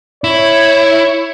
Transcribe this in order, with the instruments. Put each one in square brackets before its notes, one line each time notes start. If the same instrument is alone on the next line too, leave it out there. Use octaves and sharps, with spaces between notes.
[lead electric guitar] E4 [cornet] C#5